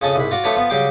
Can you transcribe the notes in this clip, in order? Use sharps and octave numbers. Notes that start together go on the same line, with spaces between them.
F2 C#3 C#4 A5 C#6 D#6
C2 G#2 B5
F4 F#4 D5
F3 A3 D4 B4 C#5
F3 B3
C#3 F#3 G3 G5 C6 D6